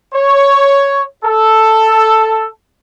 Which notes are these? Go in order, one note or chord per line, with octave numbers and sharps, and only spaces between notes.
C#5
A4